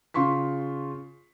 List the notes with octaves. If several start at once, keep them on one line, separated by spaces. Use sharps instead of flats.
C#3 F4 C6 C#6 B6